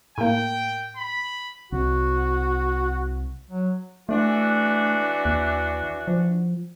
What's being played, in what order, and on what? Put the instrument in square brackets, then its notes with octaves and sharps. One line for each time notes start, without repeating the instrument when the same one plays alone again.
[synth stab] A2 A#3 [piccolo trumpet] G5
[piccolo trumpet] B5
[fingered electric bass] C2 [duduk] F#4
[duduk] F#3
[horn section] E3 D4 F#4 [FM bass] A3
[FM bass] D#2
F3